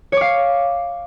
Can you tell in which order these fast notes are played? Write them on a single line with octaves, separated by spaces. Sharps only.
C#5 D6 F5